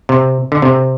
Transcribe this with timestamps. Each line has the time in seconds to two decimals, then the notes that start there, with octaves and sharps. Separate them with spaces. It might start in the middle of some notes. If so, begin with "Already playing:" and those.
0.09 C3
0.52 D3
0.62 C3